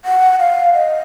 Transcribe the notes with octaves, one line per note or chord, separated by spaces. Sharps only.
F#5
F5
D#5